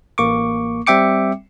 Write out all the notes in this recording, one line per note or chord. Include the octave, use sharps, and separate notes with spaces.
A1 A#3 C#6 D6
G3 C4 E5 G5 D6 C#7